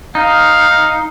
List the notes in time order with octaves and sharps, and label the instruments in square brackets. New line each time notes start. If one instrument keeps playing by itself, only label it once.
[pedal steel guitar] D#4 [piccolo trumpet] F5